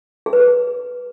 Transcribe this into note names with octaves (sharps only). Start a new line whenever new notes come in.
G#4
B4
G#4